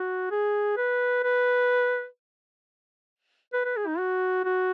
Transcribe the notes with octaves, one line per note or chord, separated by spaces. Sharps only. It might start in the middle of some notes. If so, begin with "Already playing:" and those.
Already playing: F#4
G#4
B4
B4
B4
B4
G#4
D#4
F#4
F#4